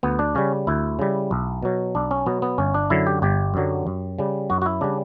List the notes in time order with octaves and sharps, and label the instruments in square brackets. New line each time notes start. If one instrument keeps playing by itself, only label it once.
[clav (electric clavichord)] D2 B3
D4
C#3 G3 C#4
D2 E4
C#3 G3
B1
B2 F#3
B1 D4
C#4
B2 F#3 B3
B3
G1 C#4
D4
F#2 D3 F#3 E4
G4
G1 G4
F#2 D3 F#3
F#2
C#3 G3
F#2 F#4
F#4
E4
C#3 G3 D4